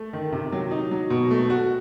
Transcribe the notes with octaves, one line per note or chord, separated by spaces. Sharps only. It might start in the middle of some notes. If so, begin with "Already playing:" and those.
Already playing: A3
D#3
C3
F#3
D#4
F#3
B2
A3
F#4